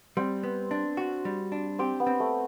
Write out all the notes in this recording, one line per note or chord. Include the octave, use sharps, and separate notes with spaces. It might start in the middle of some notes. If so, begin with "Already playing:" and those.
G3 C4
B3
D4
F#4
G3
D4
C4 G4
B3
C4
A3